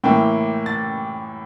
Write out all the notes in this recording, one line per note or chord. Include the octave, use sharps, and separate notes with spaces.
A2 E3 A#3 E4 G5
A6